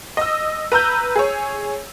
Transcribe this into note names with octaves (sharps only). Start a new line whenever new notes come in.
D#5 E6
B4 A#5 E6 G6
G#4 C#5